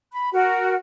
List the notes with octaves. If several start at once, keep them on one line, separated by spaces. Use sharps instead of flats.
B5
F#4 A#4